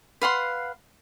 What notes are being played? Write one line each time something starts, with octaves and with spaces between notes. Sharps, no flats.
B4 F5 F#5 C6